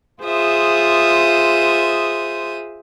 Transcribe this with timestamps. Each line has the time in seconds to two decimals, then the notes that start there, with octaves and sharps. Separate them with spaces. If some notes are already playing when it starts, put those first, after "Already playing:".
0.22 F4 G#4 C5 E5 D#6